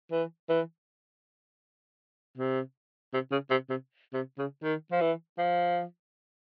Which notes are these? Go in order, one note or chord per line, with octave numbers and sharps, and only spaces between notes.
E3
E3
C3
C3
C#3
C3
C3
C3
C#3
D#3
F3
E3
F3